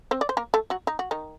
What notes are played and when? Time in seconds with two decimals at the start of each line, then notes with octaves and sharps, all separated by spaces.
0.11 C4 C5
0.21 D5
0.29 C5
0.37 A#3 A#4
0.54 A3 A4
0.70 F#3 F#4
0.87 D#4
0.99 F#4
1.11 D#3 D#4